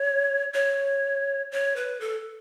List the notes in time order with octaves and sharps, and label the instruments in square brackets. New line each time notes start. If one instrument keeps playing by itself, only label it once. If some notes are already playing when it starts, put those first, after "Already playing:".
Already playing: [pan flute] C#5
C#5
C#5
B4
A4